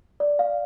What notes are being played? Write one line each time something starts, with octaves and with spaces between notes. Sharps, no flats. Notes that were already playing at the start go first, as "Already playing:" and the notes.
D5
F5